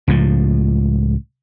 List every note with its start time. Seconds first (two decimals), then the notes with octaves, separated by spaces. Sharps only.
0.08 C#2 A2 F3